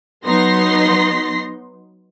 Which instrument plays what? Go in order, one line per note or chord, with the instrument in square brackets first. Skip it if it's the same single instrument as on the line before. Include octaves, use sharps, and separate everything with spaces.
[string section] F#3 B3 D#4 C6 A#6 C7